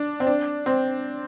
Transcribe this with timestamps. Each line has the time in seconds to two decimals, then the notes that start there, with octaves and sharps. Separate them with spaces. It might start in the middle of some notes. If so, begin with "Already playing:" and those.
Already playing: D4 D5
0.20 C4
0.27 D4
0.66 C4